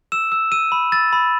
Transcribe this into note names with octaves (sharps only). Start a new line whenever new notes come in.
E6 E7
E6
E6 D#7
B5
E6 A6
B5